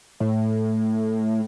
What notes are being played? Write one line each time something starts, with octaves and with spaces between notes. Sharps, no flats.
A2